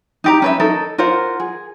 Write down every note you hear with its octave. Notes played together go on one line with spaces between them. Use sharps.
D#4 G4 A#5
C#4 B4 E5
D#4 A4 A#4 D#5
F4 A#4 C5 F#5
G#4